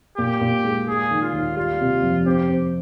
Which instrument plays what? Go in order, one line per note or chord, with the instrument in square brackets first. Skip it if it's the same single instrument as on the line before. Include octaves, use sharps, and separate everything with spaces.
[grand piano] A#2 [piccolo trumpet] G4
[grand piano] A#2
G#3
[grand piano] G#3 [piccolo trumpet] G#4
[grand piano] D#3
[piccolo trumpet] F4
[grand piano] D#2
[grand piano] G3 [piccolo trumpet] F4
[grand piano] C3
F2
[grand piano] C4 [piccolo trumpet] G4
[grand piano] C4